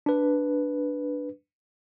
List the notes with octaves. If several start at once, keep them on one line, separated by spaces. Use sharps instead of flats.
D4 B4